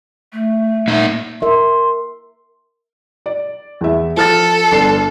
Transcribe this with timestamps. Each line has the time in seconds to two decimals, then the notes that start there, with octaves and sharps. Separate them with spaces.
0.33 A3
0.88 A#3 D#4 E5
1.42 A#4 E5 C6
3.26 D5
3.81 E2 E5
4.17 F3 A4 F6 A6
4.72 G1 D4 C7